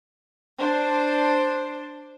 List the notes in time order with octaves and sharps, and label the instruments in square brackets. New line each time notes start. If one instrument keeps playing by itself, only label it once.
[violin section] D4 C5